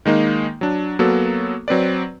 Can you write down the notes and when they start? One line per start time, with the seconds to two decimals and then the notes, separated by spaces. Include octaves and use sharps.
0.05 D#3 G#3 A#3 D#4
0.61 F#3 D4
0.99 F#3 A#3 B3 F#4 A4
1.68 F#3 C4 B4 D5